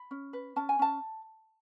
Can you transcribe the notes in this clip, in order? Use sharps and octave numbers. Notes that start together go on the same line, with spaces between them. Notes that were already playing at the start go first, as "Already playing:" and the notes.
Already playing: B5
C#4
B4
C#4 A5
G#5
C#4 A5